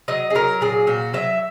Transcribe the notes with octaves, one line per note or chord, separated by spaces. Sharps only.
F#3 D#5
G#4
F#3 A#4
A#2 G#4
A#2 F#4
F#3 E5